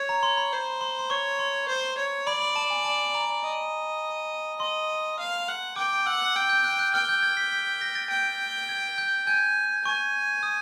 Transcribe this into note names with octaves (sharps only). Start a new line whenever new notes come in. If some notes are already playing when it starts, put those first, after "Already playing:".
Already playing: C#5
A#5
C6
B5
C5
C6
C6
C#5 C#6
C6
C5
C#5
D5 B5
B5
A5
G#5
A5
A#5
D#5
D#5 C6
F5
F#5
G5 D6
F#5 E6
G5
G6
F#6
F#6
G5 F6
G6
G#6
B6
B6
A#6
A6
G5
G#6
G6
G#5 G6
G#5 C#6
D#6